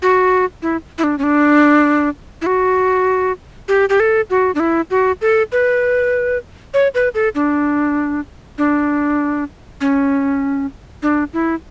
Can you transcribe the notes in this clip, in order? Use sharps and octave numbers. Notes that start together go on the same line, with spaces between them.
F#4
E4
E4
D4
C#4
D4
E4
F#4
G4
G4
A4
F#4
D4
E4
F#4
A4
B4
C#5
B4
A4
D4
D4
C#4
D4
E4